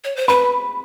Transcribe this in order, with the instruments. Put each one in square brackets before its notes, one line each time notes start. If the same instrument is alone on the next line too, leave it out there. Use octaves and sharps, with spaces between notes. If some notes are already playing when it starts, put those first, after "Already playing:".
[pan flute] C#5
C5
[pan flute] B4 [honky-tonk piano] B5